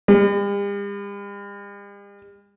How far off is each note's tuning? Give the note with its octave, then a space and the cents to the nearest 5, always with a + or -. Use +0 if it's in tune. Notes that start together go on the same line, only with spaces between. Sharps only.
G3 +45